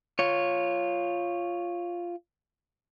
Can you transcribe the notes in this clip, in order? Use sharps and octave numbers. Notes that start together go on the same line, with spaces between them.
F4 C#5